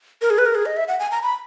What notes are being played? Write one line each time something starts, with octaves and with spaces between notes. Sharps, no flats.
A#4
G#4
B4
A#4
G#4
D#5
E5
F#5
G#5
A#5
B5